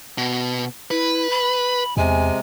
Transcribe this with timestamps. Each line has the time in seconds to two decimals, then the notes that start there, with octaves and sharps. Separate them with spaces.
0.18 B2
0.91 E4 B4
1.30 B5
1.97 E2 C3 G#3 G#5